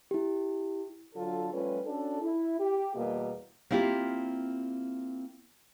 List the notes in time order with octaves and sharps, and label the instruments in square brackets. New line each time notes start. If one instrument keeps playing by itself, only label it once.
[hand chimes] E4 G4
[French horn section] D3 F#3 F4 A4
F3 G3 A3 C#4 F4 B4
C#4 D4 F#4 A4
E4
G4
E2 B2 G3 A#3
[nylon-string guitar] A#3 C4 E4 F4 G4